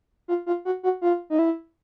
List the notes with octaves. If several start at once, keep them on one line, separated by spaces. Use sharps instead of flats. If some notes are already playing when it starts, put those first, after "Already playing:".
F4
F4
F#4
F#4
F4
D#4
E4